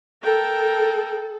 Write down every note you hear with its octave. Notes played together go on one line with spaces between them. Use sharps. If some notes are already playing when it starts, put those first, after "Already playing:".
A4 A#4 G5